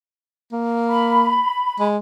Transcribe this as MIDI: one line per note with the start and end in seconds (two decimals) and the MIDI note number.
0.53 1.42 58
0.88 1.85 83
1.79 1.98 56